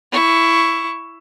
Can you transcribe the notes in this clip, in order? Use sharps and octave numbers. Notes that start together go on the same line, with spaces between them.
E4 C#6